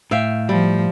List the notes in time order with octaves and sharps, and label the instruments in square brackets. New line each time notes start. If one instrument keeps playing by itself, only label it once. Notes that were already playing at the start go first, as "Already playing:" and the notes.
[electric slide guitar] A2 [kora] E5 F5 G5
[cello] F3 [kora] G3